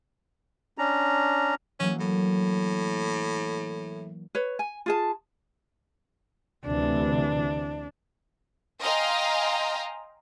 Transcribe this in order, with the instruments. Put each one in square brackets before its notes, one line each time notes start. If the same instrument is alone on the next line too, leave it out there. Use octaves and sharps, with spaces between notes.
[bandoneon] C#4 D4 A#5
[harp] E3 F#3 A#3 [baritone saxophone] C#4
[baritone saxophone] A2
[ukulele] B4 C#5
G#5
F4 G#4 A5
[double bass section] D2 C3 E3 [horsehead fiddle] D4
[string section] D#5 F5 G5 G#5 A#5 C6